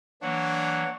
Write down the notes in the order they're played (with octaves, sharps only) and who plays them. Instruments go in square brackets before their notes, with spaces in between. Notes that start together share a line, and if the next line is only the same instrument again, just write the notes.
[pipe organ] E3 F#3 A#3 [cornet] D4 [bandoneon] C#5 F#5